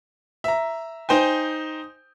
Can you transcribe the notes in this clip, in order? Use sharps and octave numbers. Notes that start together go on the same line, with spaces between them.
E5 A#5
D#4 C5 G5 G#5